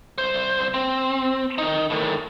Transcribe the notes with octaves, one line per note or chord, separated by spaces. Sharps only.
C2 C5
C4
D#3 D#4
A2 D#3